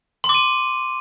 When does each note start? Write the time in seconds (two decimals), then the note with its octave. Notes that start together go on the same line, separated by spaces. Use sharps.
0.24 C6
0.29 D6
0.34 D#7